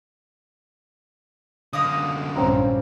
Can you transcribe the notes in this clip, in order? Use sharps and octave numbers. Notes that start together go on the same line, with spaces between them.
F#2 D3 D#5 F5 D#6
A#1 G2 C4 C#4 A#5